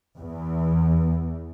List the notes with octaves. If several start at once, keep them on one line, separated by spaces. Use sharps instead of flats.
E2